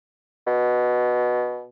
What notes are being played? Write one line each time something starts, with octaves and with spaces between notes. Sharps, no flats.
B2